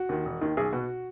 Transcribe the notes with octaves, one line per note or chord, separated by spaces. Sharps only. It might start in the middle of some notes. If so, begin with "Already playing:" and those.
Already playing: F#4
D#2 D#3
E1
D#2 D#3
B1 G#4
B2 F#4